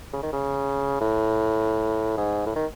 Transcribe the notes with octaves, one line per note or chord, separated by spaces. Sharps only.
C#3
D#3
C#3
A2
G#2
A2
D#3